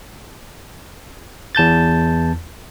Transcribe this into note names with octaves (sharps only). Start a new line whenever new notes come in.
E2 A5 G6 A6